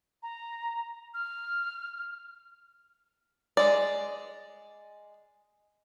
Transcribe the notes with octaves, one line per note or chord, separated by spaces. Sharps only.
A#5
F6
G#3 D5